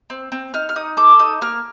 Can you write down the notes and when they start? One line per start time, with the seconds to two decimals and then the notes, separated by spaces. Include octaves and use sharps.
0.10 C4
0.32 C4
0.54 D#4 F6
0.69 F6
0.76 D#4 D#6
0.97 A4 D6
1.19 D#4 D#6
1.41 A#3 F6